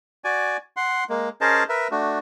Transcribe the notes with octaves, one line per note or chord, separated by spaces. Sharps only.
F#4 D5 G#5
F#5 C6
G#3 A#3
C#4 G#4 A#4 C5 D#5 A5
A#4 B4 E5
A3 D4 F#4